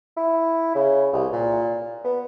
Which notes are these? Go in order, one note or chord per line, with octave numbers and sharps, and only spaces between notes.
E4
C#3
C2
A#2
B3